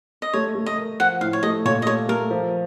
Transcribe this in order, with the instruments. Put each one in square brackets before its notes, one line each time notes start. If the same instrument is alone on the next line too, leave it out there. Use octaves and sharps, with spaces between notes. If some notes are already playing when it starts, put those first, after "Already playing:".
[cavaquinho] D#5
[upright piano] A3 [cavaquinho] C#5
[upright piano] A3
[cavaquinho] D#5
[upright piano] A#4
[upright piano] F3 [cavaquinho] F#5
[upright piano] A2 [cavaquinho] F5
[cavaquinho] C#5
[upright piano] A3 [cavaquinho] D#5
[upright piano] A#2 [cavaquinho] C#5
[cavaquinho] D#5
[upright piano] A3 [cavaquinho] C#5
[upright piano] A3 [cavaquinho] A#4
[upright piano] F3